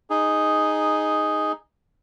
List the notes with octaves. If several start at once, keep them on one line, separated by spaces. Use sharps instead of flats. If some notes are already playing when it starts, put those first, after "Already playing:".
D#4 G#4